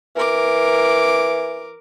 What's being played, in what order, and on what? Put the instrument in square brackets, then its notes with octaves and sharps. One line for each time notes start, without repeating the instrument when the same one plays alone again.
[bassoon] E3 [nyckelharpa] A#4 D6